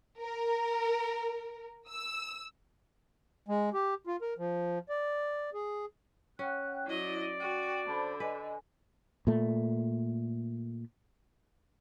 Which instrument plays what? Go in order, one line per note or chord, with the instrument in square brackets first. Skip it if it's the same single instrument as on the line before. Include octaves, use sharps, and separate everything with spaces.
[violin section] A#4
E6
[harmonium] G#3
G4
F4
A#4
F3
D5
G#4
[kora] C#4 [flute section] F#5 G5 F#6
[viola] F#3 D#5 [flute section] E4 [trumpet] D5
[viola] F#4 [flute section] G5
[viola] D3 [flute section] C5 A5 B5
[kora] B4 [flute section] D#5 G#5
[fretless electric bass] A#2 A3